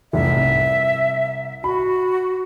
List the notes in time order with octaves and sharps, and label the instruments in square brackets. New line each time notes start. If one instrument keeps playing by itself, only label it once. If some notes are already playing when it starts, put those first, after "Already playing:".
[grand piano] F1 C2 [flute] E5
[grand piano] C2
[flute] F#4 [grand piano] B5